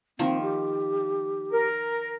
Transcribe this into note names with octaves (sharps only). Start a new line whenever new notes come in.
D#3 F3 A#3 C4
G4
A#4